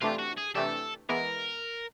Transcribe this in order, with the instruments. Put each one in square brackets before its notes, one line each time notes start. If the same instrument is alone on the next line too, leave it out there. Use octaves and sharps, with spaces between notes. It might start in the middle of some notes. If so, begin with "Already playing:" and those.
[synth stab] C3 E3 A3 D4 G4 [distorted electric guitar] F4
[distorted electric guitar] F#4
G#4
[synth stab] C3 E3 A3 D4 G4 [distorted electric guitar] A4
[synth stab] E3 G#3 B3 [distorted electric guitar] A#4